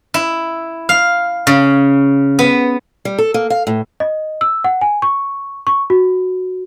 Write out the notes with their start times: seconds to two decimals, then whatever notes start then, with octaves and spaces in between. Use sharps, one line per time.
0.14 E4
0.89 F5
1.47 C#3
2.39 B3
3.05 G3
3.18 A4
3.34 A#3
3.50 F5
3.67 A2
4.00 D#5
4.41 E6
4.64 F#5
4.81 G#5
5.02 C#6
5.67 C#6
5.90 F#4